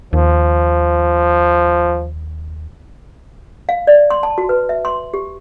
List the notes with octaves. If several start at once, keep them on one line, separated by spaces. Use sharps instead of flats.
D#2 F3
F5
D5
C6
A5
F#4
B4
E5
C6
G4